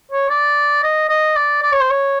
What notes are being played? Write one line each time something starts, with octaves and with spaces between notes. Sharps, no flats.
C#5
D5
D#5
D#5
D5
D5
C#5
C5
C#5